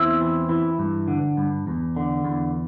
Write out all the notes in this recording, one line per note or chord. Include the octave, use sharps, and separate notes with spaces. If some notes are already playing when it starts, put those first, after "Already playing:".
Already playing: E2 C4 E4
E3
E3
G2
D3
G2
E2
D3
E2